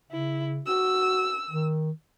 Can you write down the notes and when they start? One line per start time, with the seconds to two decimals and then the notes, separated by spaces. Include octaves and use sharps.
0.11 C#3 E4
0.66 F#4 E6
1.50 D#3